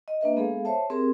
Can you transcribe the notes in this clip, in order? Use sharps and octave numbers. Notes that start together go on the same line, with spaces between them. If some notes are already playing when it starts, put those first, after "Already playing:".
D#5
A#3 D4 B4 E5
G#3 B3 G#4 A4 F5
C5 C#5 E5 A5
C4 G4 G#4 A#4